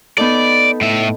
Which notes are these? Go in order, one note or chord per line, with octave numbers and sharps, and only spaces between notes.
B3 D#4 A4 D5
A2 E5